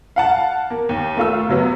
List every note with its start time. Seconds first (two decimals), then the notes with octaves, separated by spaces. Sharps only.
0.16 F5 F#5 A5
0.70 A#3
0.89 D#2
1.17 A3 F4 E6
1.49 C3 F#3 B3